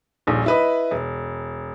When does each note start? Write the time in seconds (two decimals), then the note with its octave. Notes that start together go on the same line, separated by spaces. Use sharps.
0.27 D#1 A#1
0.46 E4 B4 D#5
0.91 E1